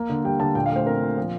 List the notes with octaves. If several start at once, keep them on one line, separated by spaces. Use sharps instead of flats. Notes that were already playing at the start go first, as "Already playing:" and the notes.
Already playing: A#3
D3
G3 G5
D3 A5
A#2 G5
F5
A3 C5
C4 A#4
A#2
F3